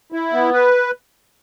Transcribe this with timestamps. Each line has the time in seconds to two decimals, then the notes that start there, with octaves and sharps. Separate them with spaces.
0.12 E4
0.33 B3
0.54 B4